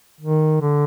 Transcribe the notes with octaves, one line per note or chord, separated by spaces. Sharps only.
D#3
D3